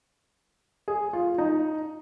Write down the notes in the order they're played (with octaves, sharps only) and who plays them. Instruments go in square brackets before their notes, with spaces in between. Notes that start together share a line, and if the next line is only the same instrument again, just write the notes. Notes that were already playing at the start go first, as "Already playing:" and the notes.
[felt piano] G#4
F4
D#4